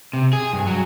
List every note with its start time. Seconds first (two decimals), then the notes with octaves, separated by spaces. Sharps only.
0.13 C3
0.33 G#4
0.53 G2
0.67 F#3